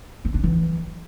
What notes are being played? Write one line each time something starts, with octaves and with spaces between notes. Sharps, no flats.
C4
D4
E3